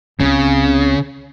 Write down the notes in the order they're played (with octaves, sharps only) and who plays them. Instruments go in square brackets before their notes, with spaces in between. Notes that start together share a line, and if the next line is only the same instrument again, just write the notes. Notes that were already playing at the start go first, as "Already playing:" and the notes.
[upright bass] C#2 C4 [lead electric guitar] C#3